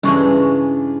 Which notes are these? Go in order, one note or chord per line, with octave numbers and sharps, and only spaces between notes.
G2 C#3 E3 G3 G#3 D4 C#6